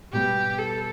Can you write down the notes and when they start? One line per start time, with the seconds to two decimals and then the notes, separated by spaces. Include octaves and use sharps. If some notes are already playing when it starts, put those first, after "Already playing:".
0.13 B2 G3 B3 G4
0.58 A4